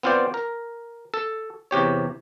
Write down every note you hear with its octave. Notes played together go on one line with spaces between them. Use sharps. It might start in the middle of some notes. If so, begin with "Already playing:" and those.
B3 C4 F4 C5 D5 G5
A#4
A4
E2 C3 G4 C#5